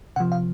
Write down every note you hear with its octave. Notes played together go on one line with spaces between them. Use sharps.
C3 F3 F#5
F5